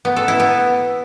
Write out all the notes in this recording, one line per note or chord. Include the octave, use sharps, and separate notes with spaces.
B3
A4
E4
B3